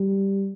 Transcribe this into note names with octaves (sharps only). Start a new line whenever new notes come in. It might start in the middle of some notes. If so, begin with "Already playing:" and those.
Already playing: G3